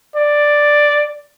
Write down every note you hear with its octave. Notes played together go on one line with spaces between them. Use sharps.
D5